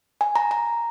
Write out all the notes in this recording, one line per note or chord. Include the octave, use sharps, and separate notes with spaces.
G#5
A#5
A#5